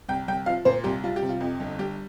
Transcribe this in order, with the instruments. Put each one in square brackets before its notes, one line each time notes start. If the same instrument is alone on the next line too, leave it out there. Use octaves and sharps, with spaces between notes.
[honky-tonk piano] C2 G5
C2 G5
F3 F5
A#2 C5
C2 G4
G3 F4
G4
C3
F4
F2
G1
G3 G4